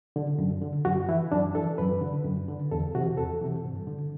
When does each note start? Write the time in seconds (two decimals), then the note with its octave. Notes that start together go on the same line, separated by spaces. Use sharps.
0.16 D3
0.38 F#2
0.62 D3
0.85 F#2 F#4
1.09 E3 E4
1.32 F#2 D4
1.55 E3 A4
1.78 F#2 B4
2.01 D3
2.25 F#2
2.48 D3
2.72 E2 A4
2.95 C3 E3 F#4
3.17 E2 A4
3.41 C3 E3
3.65 G2
3.87 D3